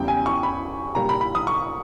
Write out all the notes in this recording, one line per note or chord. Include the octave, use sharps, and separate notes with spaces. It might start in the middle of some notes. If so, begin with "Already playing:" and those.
Already playing: E2 C#3 G3 G5
G#5
C#6
B5
A#2 G3 A#5
B5
B5
D#6
C#6